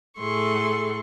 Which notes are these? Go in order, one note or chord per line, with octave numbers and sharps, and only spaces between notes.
A2 G#4 A4 C6 C#6